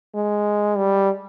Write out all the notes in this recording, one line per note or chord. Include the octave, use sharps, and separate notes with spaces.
G#3
G3